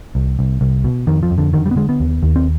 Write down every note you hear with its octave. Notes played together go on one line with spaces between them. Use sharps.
C2
C2
C2
B2
F2 D#3
F3
F2
D3
D3 D#3
G3
B3
D3 G#3
B3
D#2
D#2
C4